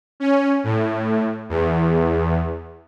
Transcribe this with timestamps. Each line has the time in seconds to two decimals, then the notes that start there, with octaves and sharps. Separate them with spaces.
0.20 C#4
0.64 A2
1.49 E2